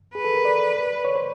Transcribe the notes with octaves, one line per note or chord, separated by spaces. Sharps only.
G#4 B4
A4
A#4
D5
C#5
C5